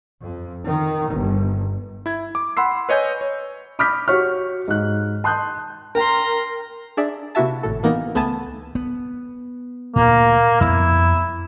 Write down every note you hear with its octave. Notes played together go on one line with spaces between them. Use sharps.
F2
D#3
G1
E4 G#6
D6
F#5 B5 C6 E6 C7
B4 C#5 D#5 G#5 G6
C#5
B5 D6 D#6 F6 G6 B6
F#4 G4 C#5 C#6 F6
G#2 F#6
A5 C6 D#6 F#6 G6
A#4 G5 A#5 C6
D4 G#4 D5 E5
C3 A#3 E4 F#4 E5 A5
G#1 A2 A4
E3 A#3 B3 D#4
C#2 A3 B3 B4 G#5 A5
B3
D2 A#2 A#3
F2 B3 E4